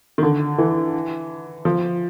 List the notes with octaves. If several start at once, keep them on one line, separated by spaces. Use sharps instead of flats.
D#3
D3
E3
F3